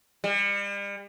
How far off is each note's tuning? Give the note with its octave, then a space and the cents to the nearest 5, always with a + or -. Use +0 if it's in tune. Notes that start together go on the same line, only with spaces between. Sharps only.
G3 +40